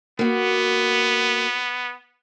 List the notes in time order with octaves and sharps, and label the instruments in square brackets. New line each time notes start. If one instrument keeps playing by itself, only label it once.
[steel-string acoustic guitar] A#3 F#4 [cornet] B3